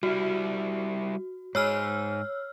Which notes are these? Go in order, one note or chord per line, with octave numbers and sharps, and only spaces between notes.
G3 E4 F#4
G#2 G#4 C#5 E6 F6